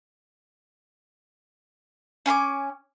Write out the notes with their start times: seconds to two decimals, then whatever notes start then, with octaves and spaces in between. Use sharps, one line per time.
2.26 C#4 G#5 C6 D6